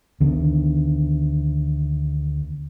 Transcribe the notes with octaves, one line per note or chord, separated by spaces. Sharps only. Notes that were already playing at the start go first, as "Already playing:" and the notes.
D2 D#3 B3 D4